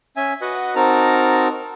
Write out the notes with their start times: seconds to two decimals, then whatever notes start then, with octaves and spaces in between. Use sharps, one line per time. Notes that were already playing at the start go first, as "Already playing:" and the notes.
0.17 C#4 E5 G#5
0.41 F#4 B4 D#5 F#5
0.76 C4 D#4 F#4 A#4 A5 A#5